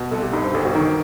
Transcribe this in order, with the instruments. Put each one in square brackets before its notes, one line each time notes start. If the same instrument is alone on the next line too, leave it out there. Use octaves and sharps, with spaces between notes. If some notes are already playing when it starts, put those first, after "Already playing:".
Already playing: [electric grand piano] B2
[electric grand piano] C2 [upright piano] A4
[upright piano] G4
[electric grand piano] G2 [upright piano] D#4
[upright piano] C5
[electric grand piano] G1 [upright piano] A4
[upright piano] F#4
[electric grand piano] D#3 [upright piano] D#4